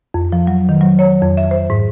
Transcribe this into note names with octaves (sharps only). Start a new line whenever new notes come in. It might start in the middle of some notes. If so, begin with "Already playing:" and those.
F2
F3
F#3
D#3
F#3
C#5
F2
E5
C5
G#2